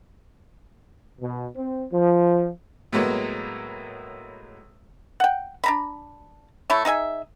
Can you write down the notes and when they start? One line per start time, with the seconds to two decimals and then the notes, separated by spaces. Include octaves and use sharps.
1.21 B2
1.56 C4
1.91 F3
2.93 A2 F#3 G#3 A#3 B3
5.20 F#5 G5
5.64 D4 A#5 B5
6.70 A3 E4 C#5
6.85 D#4 G#4 E5 G#5